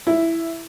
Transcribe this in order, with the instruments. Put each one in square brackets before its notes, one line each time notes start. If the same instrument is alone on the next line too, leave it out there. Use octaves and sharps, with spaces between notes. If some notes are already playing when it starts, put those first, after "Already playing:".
[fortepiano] E4